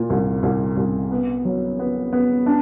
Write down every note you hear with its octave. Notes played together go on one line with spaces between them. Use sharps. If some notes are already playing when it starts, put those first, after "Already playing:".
Already playing: A#2
C2
C2
C2
B3
F#3
B3
B3
D4